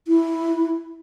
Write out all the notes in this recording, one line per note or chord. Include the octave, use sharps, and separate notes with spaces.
E4